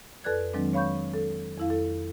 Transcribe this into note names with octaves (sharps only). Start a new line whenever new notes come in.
F2 A4 B4 D5 F#6 G#6
D#3 F#3 G#3 C4 D4
C#5 F5 B5 C#6 G6
A4
F2 E4 F5
A4